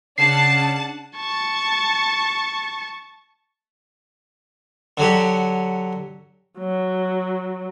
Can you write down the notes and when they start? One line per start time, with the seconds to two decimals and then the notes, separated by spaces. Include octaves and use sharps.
0.18 C#3 D4 F#5 A5 C7
1.16 A5 C#6
4.97 D3 F#3 G4
6.59 F#3